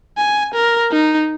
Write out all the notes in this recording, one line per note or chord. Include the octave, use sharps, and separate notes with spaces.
G#5
A#4
D#4